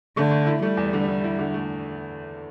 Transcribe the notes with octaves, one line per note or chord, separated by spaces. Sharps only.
D3 A3
A3
E4
G3 A3
E2
D3
D3
E4
D3
A3